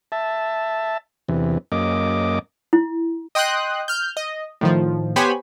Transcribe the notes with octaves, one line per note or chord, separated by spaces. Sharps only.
E5 A5
E2 C3 E3
F#2 A#3 D#5 D6
E4
D#5 G5 C6 D#6 F#6
F6 G6
D#5
A2 D#3 F3
B3 G4 C5 C#5 G#5 B5